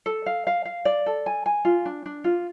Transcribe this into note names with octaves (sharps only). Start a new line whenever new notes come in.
A4
F5
F5
F5
D5
A4
G#5
G#5
F4
D4
D4
F4